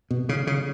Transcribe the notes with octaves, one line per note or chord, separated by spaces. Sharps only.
B2
C#3
C#3